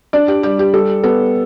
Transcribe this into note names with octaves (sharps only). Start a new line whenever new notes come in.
D4 D5
G4
G3 G4
G4
G3 A4
B3 A4